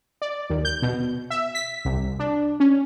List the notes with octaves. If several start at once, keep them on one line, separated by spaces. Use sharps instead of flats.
D5
D#2
G6
B2
E5
B6
C2
D4
C#4